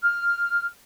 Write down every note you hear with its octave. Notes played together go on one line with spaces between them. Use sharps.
F6